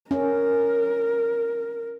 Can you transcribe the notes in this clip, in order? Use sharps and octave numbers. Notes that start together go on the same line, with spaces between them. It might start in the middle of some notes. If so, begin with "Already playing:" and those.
C#4 A#4